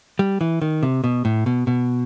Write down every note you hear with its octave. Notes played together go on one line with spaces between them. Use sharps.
G3
E3
D#3
C3
B2
A2
B2
B2